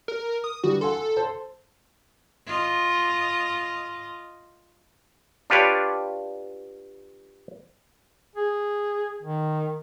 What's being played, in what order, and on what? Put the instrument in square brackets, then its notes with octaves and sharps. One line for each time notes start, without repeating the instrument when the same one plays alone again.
[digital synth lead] A#4
D#6
[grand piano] D3 E3 G3 [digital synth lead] F#4
[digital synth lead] A4 [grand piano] F#5 G#5 C6
[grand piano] C5 A5 C6
[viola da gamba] F4 D#5
[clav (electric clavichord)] D4 F4 G4 B4 C#5 D5
[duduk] G#4
D#3